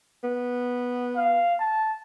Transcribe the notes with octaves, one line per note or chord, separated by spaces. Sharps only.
B3
F5
A5